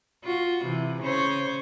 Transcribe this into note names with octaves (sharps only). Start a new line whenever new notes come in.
F4 F#4
C3 E3
C#3 C5 C#5